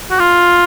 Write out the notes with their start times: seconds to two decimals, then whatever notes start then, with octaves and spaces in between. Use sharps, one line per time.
0.11 F#4
0.19 F4